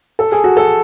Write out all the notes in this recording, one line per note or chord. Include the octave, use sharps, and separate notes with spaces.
A4
G#4
F#4
A4